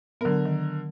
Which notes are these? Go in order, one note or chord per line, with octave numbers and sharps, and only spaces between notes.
D3 F#3 B3 A#4
D#3